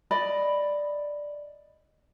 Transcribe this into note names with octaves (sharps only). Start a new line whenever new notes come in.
D5 D#5 B5